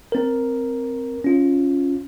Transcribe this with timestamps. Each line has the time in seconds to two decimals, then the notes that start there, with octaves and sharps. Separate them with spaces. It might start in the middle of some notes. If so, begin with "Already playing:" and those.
0.12 C4 A#4
1.24 C#4 F4